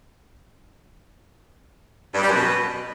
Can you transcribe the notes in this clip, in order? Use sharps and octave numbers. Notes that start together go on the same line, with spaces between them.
G2
G3
F#2
B2